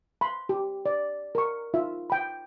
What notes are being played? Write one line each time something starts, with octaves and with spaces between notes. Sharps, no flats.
B5 C6
G4
D5
A#4 C#6
D#4 F4 E5
G5 B5